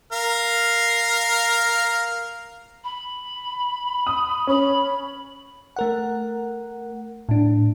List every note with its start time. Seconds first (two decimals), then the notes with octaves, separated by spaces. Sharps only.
0.12 A#4 F5
2.84 B5
4.07 D#6
4.47 C#4 B5
5.76 A3 A#4 F#5
7.29 A2 D4